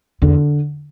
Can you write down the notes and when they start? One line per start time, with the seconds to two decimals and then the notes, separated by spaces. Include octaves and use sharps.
0.22 E2 D3